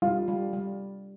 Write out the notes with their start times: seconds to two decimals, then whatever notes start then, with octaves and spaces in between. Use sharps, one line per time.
0.02 G3 F4
0.28 G3
0.53 G3